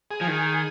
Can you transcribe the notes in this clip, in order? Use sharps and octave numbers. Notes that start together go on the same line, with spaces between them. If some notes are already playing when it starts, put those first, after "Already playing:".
G#4
F3
D#3